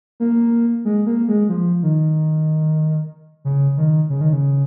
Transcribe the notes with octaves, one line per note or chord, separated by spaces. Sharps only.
A#3
G#3
A#3
G#3
F3
D#3
C#3
D#3
C#3
D#3
C#3